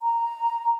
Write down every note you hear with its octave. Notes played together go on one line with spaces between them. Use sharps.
A#5